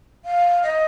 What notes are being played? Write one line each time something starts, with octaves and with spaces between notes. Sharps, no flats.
F5
D#5